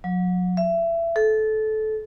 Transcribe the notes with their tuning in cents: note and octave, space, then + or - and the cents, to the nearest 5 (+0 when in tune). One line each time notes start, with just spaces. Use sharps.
F#3 -35
E5 +25
A4 -20